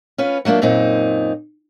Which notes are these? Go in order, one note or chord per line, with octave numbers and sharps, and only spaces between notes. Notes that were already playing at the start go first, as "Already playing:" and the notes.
C#4 F4 B4
F#3 A3 A#3 D4 F4
F#2 A#2 C4 D#4